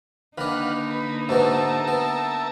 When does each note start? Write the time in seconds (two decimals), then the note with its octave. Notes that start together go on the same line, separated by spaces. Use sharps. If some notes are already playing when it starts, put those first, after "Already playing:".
0.38 D3 D#3 A#3 D4 D#4 B4 F5 F#5
0.91 B4
1.29 G#2 B2 B3 A#4 E5 A5
1.88 B3